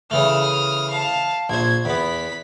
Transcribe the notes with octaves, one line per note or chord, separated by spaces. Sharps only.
C#3 E3 A3 D#6 F6
F5 A5
A#1 C5 G#6
E2 B3 B5 B6